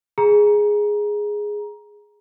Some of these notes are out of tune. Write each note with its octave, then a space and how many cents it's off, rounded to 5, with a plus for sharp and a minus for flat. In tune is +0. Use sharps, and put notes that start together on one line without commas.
G#4 +0 A#5 +20